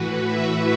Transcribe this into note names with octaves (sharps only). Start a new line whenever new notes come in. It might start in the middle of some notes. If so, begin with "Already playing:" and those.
Already playing: A2 E3 F#4 B4
B4 E5